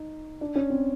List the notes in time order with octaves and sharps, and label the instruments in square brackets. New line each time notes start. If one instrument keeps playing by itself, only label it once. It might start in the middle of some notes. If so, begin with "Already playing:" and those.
Already playing: [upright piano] D#4
D4
C#4
C4